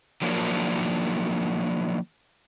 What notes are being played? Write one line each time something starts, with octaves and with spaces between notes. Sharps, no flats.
D#3 F3 F#3 A#3 D4